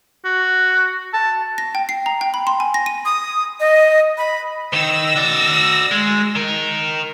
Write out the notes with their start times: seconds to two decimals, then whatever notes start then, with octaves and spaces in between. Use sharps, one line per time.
0.24 F#4
1.13 A5
1.58 A#6
1.75 G5
1.89 C7
2.06 A#5
2.21 G5
2.34 B5
2.47 C6
2.60 G#5
2.74 A#6
2.86 D#7
3.05 D#6
3.60 D#5
4.18 B5
4.73 D#3 E6 A#6
5.16 F#4 D5
5.91 G#3
6.35 D#3 A#4